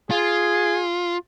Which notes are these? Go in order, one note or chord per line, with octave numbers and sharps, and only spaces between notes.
F4 G#4